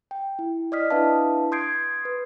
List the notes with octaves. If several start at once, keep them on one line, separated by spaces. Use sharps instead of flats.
G5
E4
D5 D#5 D#6 F6 B6
D4 E4 B4 E5 F5 A5
C6 D#6 G6 G#6 C7 D7
B4